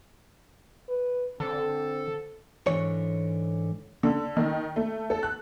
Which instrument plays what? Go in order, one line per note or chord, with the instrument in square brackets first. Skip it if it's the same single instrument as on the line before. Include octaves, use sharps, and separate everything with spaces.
[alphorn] B4
[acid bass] D3 [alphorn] C4 [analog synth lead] A4
[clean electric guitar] G#2 D3 E3 C#5
[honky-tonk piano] D3
D#3
A3
A4
F#6